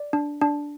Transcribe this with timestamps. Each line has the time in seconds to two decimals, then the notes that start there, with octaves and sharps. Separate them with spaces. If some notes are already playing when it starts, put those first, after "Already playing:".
Already playing: D5
0.13 D4
0.41 D4